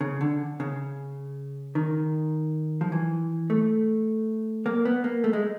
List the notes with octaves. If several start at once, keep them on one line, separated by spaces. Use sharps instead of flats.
C#3
D3
C#3
D#3
F3
E3
A3
A#3
B3
A#3
A3
G#3